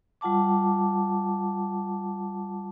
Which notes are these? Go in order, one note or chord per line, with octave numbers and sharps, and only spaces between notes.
G3 F4 F#5 A5 D6